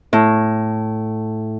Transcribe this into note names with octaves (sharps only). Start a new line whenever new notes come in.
A2